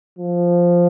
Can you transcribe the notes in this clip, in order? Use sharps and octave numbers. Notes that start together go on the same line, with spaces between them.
F3